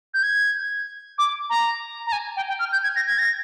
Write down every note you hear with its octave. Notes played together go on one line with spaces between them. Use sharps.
G6
G#6
D6
A#5
A#5
G#5
G5
G5
F6
G6
G#6
A#6
G#6
A#6